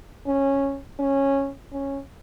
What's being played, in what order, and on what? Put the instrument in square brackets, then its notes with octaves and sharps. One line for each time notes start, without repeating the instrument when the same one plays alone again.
[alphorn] C#4
C#4
C#4